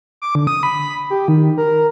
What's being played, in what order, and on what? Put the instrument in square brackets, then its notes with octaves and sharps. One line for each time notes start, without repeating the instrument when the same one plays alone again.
[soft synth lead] D6
D3
D#6
B5
G4
D#3
A#4